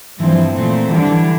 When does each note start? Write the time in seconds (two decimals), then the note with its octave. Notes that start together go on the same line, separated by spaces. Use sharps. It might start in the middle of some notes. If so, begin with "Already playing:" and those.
0.19 G2 E3 F3 C4
0.54 A#2 A3 C4
0.89 D3 E3 G3 D4
1.07 E3